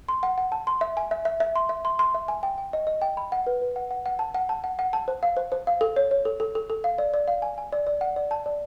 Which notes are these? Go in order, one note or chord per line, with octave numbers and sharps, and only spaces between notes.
C6
F#5
F#5
A5
C6
E5
G#5
E5
E5
E5
C6
E5
C6
C6
E5
G#5
G5
G5
D#5
D#5
G5
B5
F#5
B4
B4
F#5
F#5
F#5
A5
F#5
A5
F#5
F#5
A5
C5
F5
C5
C5
F5
A4
C#5
C#5
A4
A4
A4
A4
F5
D5
D5
F5
G#5
G#5
D5
D5
F#5
D5
A5
D5